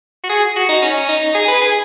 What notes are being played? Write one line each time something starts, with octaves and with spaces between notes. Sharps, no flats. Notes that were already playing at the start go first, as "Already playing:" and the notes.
F#4
G#4
F#4
D#4
C#4
D#4
G#4
B4
G#4